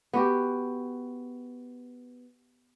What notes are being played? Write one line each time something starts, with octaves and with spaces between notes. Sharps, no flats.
B3 F#4 G4